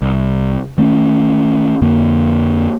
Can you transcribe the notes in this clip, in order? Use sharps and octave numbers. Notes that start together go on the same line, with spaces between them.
C2
D#3 A3 C4 C#4
F2 D3 A#3